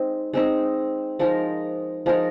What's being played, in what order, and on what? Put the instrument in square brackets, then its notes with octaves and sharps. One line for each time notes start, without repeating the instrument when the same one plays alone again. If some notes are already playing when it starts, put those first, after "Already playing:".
Already playing: [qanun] G#3 C4 D#4
G#3 C4 D#4
F3 G#3 D#4 A#4
F3 G#3 D#4 A#4